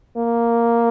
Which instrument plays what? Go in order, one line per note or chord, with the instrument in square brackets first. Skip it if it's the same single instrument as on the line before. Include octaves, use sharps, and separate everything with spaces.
[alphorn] A#3